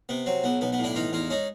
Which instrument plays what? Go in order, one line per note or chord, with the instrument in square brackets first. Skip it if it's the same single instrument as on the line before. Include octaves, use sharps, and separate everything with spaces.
[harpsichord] C3 B3
F#3 C4
B1 B3
B1 B3
B3
A2
D4 E4
E3 D#4 F4
E2 D#4 F4
G#3 C#4 D#4